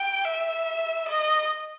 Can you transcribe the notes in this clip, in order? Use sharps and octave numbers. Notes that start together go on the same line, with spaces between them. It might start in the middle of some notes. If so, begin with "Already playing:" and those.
Already playing: G5
E5
D#5